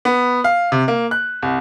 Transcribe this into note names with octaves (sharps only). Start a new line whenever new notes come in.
B3
F5
C3
A#3
F#6
C2